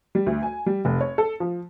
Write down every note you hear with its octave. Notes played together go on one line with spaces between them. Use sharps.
G3
D2
G#5
G3
F1
C#5
A4
F3